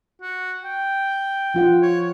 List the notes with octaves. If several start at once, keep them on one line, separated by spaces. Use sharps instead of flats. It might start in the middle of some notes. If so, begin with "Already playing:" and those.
F#4
G5
F3 F4 F#5
C#5